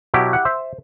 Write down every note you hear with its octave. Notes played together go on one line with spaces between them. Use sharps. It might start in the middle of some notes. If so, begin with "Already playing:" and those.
B2 F#3 E4 G4
F#5
C5 E5